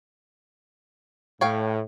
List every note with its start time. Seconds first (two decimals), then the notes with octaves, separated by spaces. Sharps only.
1.41 A2 C#5 F5 G5